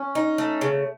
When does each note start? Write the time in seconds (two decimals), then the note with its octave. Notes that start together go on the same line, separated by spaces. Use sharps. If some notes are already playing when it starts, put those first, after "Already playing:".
Already playing: C#4
0.15 D#4
0.38 A3
0.61 C#3